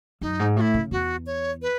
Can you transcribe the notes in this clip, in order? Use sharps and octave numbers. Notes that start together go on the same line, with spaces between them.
F#2 D#4
G#2
A2 E4 F#4
C#3
E2 F#4
C#5
B4